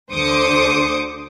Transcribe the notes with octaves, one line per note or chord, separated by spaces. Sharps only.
D2 D3 C5 D6 D#6 C#7